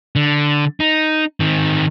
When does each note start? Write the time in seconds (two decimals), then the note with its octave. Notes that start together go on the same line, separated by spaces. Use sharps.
0.16 D3
0.80 D#4
1.40 D#3 C4